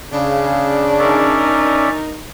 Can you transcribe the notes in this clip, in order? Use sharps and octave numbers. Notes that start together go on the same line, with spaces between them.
C#3 D4
C#4 D#4 A#4 D5 E5